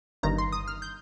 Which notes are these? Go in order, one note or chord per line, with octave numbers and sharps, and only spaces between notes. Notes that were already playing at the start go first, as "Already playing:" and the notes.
G1 G2 D#3 A#5
C6
D#6
F6
G6